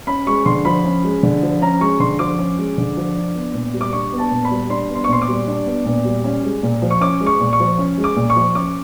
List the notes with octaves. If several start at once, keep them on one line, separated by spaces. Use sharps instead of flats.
C#4 B5
G#3 C#6
D3 C6
F3 B5
C#4
G#3
D3
F3
C#4 A#5
G#3 C#6
D3 C6
F3 D6
C#4
G#3
D3
F3
D4
B3
A#2
G3
D6
D4 C#6
B3
A5
A#2
B5
G3
D4 C6
B3
C6
C#6
A#2 C6
D6
G3
D4
B3
A#2
G3
C#4
G#3
A#2
F3
C#6
C#4 D6
G#3
C#6
A#2
C#6
F3
C#4
G#3
D6
A#2
C#6
F3
C#4 D6